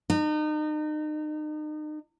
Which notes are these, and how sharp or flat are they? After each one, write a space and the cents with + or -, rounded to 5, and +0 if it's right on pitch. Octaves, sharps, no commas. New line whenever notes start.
D#4 -35